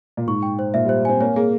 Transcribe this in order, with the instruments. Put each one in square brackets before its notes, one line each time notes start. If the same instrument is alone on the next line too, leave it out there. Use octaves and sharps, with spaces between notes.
[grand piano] A#2
[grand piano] G#2 [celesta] C#6
[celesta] G5
C5
[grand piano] A#2 [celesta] E5
[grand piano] G3 [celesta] C5
[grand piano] C4 [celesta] G#5
[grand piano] A#3 [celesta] C#5
[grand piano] A#3 [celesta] G#4